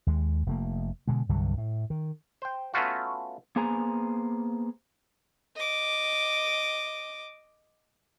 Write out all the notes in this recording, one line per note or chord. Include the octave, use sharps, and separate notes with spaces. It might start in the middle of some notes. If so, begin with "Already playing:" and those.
D#2 G#3
F1 A3 A#3
B2 D3 G#3
C2 G2 D3 F#3
A2
D#3
C5 G5
A3 B3 C#4 F4 F#4
A#3 B3 G#4 C5 G#5 A#5
D#5 D6